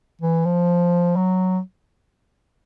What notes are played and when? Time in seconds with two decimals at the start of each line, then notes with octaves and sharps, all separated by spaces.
0.22 E3
0.45 F3
1.16 F#3